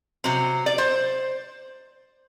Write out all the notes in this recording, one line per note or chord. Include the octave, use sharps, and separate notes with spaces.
C3 F#3 C4
D5
C5